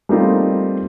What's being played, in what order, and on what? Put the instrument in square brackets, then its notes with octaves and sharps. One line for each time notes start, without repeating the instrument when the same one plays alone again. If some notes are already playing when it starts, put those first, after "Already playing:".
[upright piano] G3 A3 A#3 C4 D#4 F4